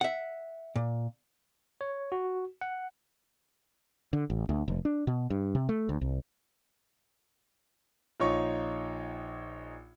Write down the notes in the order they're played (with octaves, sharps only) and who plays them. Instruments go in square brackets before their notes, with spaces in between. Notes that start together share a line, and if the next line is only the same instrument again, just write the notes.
[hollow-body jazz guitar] E5 F#5
A#2
[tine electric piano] C#5
F#4
F#5
[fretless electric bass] D3
A1
D2
F1
D4
B2
G2
C3
A3
D2
C2
[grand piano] A#1 D#4 F4 C#5 C#6